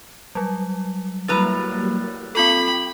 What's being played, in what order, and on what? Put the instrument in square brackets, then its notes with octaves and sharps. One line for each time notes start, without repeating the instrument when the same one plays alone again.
[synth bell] F#3 G3
[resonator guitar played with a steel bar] A2 B4 A#5 [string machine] F#3 G3 A#3 [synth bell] F#6 A6
[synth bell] C4 F4 A4 [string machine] G5 [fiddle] B5